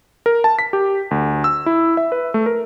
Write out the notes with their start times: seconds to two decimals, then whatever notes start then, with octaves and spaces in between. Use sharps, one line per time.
0.26 A#4
0.44 A5
0.59 B6
0.73 G4
1.11 D2
1.44 E6
1.66 E4
1.97 E5
2.12 B4
2.34 A3
2.46 A#4